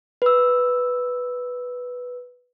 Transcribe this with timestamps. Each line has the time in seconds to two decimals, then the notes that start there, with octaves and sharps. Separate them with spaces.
0.22 B4 E6